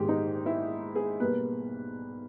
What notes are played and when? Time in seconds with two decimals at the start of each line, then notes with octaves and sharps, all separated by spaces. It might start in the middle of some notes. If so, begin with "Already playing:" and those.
Already playing: A#1 G#2 D#3 G#3 B3 G4 G#4
0.09 D#4
0.46 E4
0.95 G#4
1.20 B1 B2 G3 A#3 B4